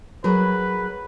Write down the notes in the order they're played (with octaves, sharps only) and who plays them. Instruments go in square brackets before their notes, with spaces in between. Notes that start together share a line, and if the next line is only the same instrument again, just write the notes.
[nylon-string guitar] F#3 G#4 A#4 [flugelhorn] B4